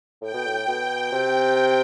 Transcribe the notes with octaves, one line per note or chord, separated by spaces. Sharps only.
A2 G5
B2
A2
B2
C3 G5
G5